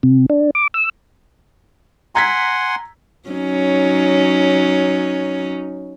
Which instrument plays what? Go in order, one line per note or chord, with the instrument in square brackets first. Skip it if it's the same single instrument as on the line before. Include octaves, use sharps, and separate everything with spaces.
[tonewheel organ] C3
D4
D6
E6
[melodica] F#5 G#5 C6 [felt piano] A#5 G#6 B6
[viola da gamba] F#3 C#4 D#4